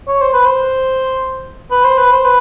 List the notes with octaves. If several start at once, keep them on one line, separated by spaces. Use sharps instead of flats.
C#5
C5
B4
C5
B4
C5
B4
C5
B4